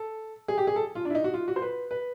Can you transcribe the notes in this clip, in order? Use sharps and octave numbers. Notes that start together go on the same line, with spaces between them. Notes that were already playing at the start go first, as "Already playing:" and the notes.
Already playing: A4
G#4
G4
G#4
A4
F4
D4
E4
D#4
F#4
F4
F#4
C5
B4
B4